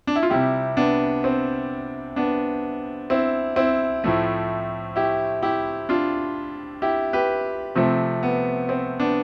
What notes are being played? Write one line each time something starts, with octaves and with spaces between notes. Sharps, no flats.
D4
E4
F4
C3 G3 E4 G4
B3 D4
C4
B3 D4
C4 E4
C4 E4
A2 F3 A3
E4 G4
E4 G4
D4 F4
E4 G4
G4 B4
C3 F3 A3 C4
B3
C4
B3 D4